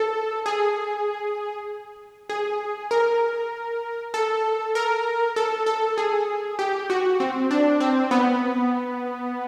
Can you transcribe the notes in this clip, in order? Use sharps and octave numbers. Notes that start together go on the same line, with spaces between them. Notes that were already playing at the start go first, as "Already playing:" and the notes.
Already playing: A4
G#4
G#4
A#4
A4
A#4
A4
A4
G#4
G4
F#4
C4
D4
C4
B3